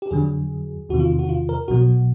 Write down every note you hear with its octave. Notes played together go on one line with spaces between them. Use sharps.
G4
F2 D3 F#3 G#4
E2 C3 D#3 F#4
F4
F#4
F4
A#4
B1 B2 F#3 F#4